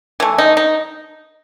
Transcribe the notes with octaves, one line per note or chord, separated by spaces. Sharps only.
E3 A3
D#4
D#4